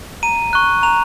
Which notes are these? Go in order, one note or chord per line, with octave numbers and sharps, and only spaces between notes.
A#5 D#7
C#6 F#6
A#5 F7